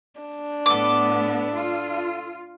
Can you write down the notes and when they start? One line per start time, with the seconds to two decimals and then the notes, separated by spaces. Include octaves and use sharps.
0.21 D4
0.66 A2 B3 A4 D6
1.54 F4